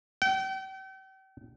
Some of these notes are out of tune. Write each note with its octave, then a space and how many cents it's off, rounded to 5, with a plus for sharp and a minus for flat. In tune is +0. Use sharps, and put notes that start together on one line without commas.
G5 -40